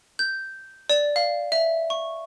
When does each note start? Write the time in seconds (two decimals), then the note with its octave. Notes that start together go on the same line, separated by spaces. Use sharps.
0.19 G6
0.90 D5
1.16 F5
1.52 E5
1.90 C#6